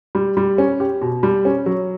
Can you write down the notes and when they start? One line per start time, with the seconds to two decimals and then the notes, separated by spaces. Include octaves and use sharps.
0.15 G3
0.37 G3
0.58 C#4
0.80 G4
1.01 B2
1.23 G3
1.45 C#4
1.66 F#3